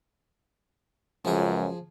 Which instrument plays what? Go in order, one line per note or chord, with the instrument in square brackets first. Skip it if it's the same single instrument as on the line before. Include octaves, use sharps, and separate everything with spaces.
[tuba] C#2 [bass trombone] F#2 [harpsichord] F3 G#4